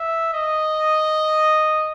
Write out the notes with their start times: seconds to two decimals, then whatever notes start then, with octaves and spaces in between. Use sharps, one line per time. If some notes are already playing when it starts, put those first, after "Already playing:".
Already playing: E5
0.33 D#5